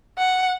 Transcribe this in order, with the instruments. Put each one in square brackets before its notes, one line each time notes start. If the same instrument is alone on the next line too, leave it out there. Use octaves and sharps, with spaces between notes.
[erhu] F#5